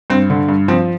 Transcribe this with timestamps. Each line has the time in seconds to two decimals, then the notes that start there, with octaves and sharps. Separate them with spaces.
0.10 G2 C4
0.30 D3
0.49 G2
0.68 F3 C4